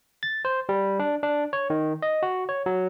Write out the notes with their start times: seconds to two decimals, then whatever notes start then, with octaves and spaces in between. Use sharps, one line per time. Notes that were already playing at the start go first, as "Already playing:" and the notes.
0.23 A6
0.45 C5
0.69 G3
0.99 D4
1.23 D4
1.53 C#5
1.70 D#3
2.02 D#5
2.23 F#4
2.49 C#5
2.66 F#3